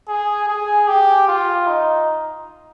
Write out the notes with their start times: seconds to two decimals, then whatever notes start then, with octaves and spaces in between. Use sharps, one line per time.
0.08 G#4
0.49 G#4
0.88 G4
1.28 F4
1.67 D#4